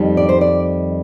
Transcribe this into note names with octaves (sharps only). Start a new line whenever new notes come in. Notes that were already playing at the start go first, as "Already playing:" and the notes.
Already playing: F2 D#3 G3
D5
C5
D5